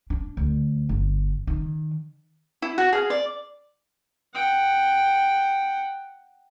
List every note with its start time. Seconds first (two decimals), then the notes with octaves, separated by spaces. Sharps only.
0.10 D4
0.37 D2
0.89 G1
1.47 D#3
2.62 E4
2.78 F#4
2.92 G#4 F5
3.10 D5
4.34 F#5 G5